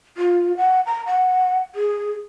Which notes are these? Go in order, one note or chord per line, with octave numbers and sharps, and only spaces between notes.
F4
F#5
A#5
F#5
G#4